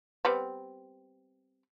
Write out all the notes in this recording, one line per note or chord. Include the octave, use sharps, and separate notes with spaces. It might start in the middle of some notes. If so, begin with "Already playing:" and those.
G3 B3 C4